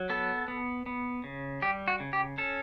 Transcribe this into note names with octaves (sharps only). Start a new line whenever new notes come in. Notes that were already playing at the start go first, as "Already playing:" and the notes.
Already playing: F#3
B3 A4
B3
B3
C#3
G3 G4
F#4
C#3
G4
C#4 A4